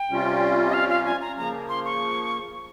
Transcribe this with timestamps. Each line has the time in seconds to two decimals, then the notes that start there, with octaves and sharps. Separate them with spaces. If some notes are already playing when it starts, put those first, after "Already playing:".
Already playing: G5
0.10 C3 G3 C#4 F4
0.68 D#5
0.74 F5
0.90 F5
1.05 G#5
1.21 A#5
1.37 C#3 F3 A#3 A#5
1.69 C6
1.85 C#6